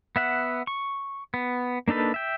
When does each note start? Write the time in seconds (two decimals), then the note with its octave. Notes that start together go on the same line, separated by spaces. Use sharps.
0.16 B3 E5 F#5
0.67 C#6
1.34 B3
1.88 A#3 D4 D#4 A4 B4
2.14 E5 G5